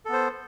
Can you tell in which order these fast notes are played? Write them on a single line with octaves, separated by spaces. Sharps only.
A4 B3 C5